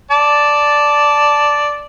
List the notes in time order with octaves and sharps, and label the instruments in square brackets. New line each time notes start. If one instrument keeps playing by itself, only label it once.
[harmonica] D5 A5